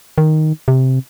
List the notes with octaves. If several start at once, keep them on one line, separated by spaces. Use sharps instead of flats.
D#3
C3